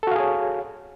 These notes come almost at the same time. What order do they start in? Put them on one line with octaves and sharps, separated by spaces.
A4 F#4 F5 G#4 C#5